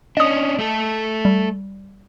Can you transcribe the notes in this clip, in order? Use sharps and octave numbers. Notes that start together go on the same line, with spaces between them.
C#4 D4 D#5 D#6
A3 A4
G3